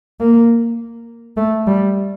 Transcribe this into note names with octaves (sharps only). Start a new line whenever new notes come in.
A#3
A3
G3